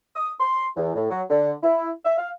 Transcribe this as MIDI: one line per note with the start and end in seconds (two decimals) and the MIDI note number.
0.16 0.32 87
0.40 0.67 84
0.77 0.92 40
0.95 1.10 45
1.10 1.23 54
1.30 1.51 50
1.63 1.90 64
2.05 2.15 76
2.18 2.30 77